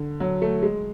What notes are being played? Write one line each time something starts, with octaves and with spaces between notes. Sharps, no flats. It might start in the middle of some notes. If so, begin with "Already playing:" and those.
Already playing: D3
F#3
A3
G#3